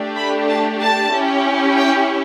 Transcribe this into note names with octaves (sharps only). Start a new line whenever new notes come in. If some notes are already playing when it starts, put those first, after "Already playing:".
Already playing: A3 D4 G4
B5
A5
A5
C#4 E4 G4
G5